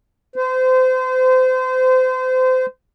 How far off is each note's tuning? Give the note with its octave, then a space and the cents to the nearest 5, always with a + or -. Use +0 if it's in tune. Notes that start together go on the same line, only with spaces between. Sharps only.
C5 -30